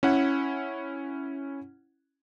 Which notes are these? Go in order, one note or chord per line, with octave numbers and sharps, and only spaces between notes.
C#4 E4 F#5